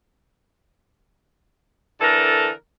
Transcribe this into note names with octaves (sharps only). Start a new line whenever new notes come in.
D3 E3 A4 A#4